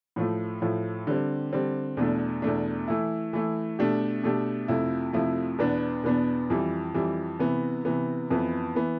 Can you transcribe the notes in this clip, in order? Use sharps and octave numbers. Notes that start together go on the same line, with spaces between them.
A2 F3 A3
A2 F3 A3
D3 G3 C4
D3 G3 C4
E2 B2 A3 D4
E2 B2 A3 D4
E3 A3 E4
E3 A3 E4
B2 A3 D4 G4
B2 A3 D4 G4
F2 C3 F3 A3 E4
F2 C3 F3 A3 E4
E2 B2 B3 D4
E2 B2 B3 D4
F2 E3 G3
F2 E3 G3
C3 E3 B3
C3 E3 B3
F2 E3 B3
E3 B3